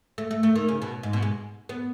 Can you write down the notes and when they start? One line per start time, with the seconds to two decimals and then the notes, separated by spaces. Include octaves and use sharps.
0.18 A3
0.31 A3
0.43 A3
0.56 D#3
0.68 C#3
0.82 B2
1.03 G#2
1.13 B2
1.22 G#3
1.69 B3